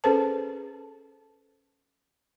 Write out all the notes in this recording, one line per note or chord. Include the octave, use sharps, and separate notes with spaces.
C#4 G#4 A4 B4 C5 A5